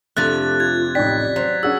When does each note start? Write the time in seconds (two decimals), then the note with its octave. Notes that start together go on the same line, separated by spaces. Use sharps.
0.17 F2 C3 A3 D4 F#6 A6
0.60 F4 G#6
0.95 A1 D#4 D5 G5 B6
1.36 F#3 C5
1.63 C#4 F#4 G#4 E6